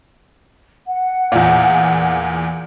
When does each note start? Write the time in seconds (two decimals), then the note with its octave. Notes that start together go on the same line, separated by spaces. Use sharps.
0.87 F#5
1.32 E2 A#2